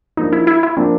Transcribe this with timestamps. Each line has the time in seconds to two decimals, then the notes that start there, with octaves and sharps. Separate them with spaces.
0.17 F3 A#3 D4 D#4
0.32 E4
0.47 E4
0.63 E4
0.77 F3 A#3 C4 D4